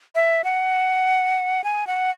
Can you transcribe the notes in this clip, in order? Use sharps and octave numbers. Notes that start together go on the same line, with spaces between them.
E5
F#5
G#5
F#5